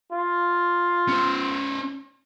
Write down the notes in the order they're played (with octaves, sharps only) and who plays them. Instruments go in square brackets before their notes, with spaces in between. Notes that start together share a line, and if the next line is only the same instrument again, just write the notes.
[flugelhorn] F4
[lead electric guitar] C#4 C5